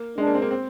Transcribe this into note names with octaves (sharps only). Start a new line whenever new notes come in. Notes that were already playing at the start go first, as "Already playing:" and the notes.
Already playing: A#3
G#3 D4
A#3
C4
A#3
C4